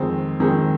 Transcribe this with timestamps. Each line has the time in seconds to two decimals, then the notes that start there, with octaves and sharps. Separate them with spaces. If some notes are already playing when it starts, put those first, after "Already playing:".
Already playing: F2 D#3 G#3 C4
0.40 F2 D#3 G#3 C4